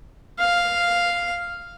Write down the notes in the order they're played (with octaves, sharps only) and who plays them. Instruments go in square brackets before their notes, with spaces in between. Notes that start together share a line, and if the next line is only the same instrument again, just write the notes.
[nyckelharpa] F5